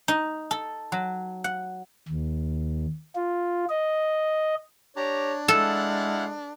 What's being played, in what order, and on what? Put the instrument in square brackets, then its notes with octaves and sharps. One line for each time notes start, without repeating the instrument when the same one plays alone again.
[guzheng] D#4
A4
F#3
F#5
[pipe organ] D#2
F4
D#5
[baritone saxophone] D4 [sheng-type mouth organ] G4 A#5 [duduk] C#5
[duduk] G#3 [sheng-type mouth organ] E4 F5 F#5 [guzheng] A4